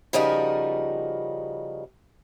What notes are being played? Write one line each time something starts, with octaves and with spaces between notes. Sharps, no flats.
C#3 F3 G3 D#4 F#4 A#4